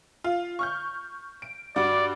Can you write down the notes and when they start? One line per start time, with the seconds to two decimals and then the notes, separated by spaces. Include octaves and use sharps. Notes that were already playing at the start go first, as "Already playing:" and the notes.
0.24 F4
0.59 C#6 F6 G6
1.42 D7
1.76 G2 F#4 D5 D6